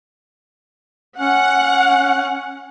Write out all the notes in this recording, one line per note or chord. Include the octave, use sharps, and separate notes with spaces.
C#4 F#5